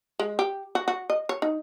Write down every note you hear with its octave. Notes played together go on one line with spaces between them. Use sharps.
G#3
G4
F#4
F#4
D#5
C#5
D#4